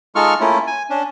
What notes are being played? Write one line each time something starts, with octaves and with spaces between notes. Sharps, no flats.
G#3 D#4 F4 A4 C#6 F6
A3 A#3 C#4 E4 F4
G#5
C#4 D4